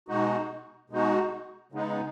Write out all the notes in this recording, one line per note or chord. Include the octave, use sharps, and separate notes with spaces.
B2 G#3 D#4 F#4
B2 G#3 D#4 F#4
C#3 G#3 B3 D#4